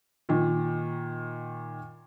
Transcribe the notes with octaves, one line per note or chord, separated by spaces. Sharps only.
A#2 D#3